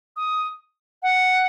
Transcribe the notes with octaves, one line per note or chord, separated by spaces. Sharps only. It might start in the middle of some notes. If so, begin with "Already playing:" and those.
D#6
F#5